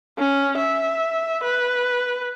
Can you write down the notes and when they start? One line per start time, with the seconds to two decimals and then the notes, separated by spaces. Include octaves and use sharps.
0.18 C#4
0.58 E5
1.43 B4